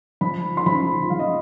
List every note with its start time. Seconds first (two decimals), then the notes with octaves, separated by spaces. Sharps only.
0.21 F3 B5
0.57 C6
0.66 F3 B5
1.10 F3 F5
1.19 D#5